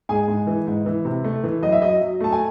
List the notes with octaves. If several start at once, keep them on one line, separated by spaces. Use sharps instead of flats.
G#2 G#4 G#5
G#2
E3
G#2
E3
C3
A3
E3
F#2 D#5
E5
F#3 D#5
F#3
A3 A5
G#5